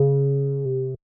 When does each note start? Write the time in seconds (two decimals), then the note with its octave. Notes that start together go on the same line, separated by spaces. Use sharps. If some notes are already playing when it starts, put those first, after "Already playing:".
Already playing: C#3
0.65 C3